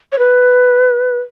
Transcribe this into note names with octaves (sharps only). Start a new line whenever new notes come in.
C#5
B4